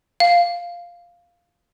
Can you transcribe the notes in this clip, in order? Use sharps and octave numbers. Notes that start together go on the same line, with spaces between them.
F5